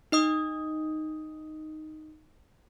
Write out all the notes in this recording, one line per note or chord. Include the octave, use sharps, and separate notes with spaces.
D#4 D#5 D#6